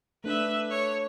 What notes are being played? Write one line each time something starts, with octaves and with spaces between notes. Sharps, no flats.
A3 D4 A4 B4 E5
C#5